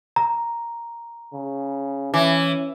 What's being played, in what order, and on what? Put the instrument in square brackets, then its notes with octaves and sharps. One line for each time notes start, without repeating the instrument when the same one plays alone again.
[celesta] A#5
[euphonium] C#3
[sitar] E3 [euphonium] C#4